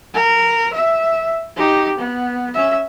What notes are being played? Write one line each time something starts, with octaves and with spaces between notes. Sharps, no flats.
A#4
E5
D#4 G4
B3
C#4 E5